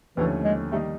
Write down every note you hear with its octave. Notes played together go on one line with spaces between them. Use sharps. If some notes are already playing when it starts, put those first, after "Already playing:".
D#2 D3 E3 F3 A3 C#4
G#3
D#3 G3 A3 A#3 D#4